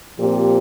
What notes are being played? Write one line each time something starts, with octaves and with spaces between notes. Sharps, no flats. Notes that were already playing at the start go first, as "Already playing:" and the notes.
A#2 F3 C4 G4